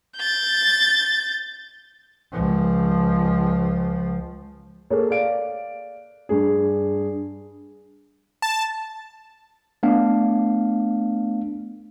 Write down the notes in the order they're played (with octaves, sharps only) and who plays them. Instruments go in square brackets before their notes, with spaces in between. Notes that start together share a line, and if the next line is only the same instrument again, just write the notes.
[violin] G6 A6
[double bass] C#2 F3
[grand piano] A#3 G#4 A4 C#5
D5 F5 D7
G2 G#4
[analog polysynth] A5
[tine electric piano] A3 B3 D4 F5